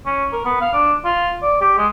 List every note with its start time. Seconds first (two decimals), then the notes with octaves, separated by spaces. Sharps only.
0.06 C#4
0.32 A#4
0.45 B3
0.61 F5
0.73 D4
1.05 F4
1.42 D5
1.61 G4
1.78 G#3